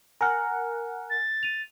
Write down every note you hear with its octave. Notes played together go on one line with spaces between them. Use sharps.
A#4 F#5 G#5 F6
A6
D#7 F7